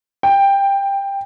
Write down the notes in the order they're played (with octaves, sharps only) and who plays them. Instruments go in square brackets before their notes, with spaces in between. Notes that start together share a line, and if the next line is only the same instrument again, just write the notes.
[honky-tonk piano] G5